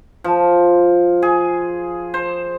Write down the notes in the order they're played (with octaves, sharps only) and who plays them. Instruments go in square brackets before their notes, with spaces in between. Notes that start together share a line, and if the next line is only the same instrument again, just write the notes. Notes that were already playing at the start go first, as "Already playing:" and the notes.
[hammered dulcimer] F3
G#4
C5